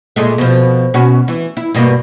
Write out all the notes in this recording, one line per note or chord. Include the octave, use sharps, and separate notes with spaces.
A#2 G#3 A3
B2 F3
B2 C#4 F#4
E3
E4
G2 B2 A#3